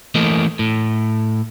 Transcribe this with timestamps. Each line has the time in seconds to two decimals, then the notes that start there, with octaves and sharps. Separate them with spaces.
0.15 E3 A3 A#3 D#5
0.59 A2